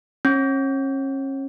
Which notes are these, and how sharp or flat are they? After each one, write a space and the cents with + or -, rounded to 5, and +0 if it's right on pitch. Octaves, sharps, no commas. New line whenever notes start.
C#4 -35